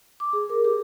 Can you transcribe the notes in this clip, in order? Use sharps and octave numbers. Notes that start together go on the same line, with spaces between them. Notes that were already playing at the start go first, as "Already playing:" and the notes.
D6
G#4
A#4
G4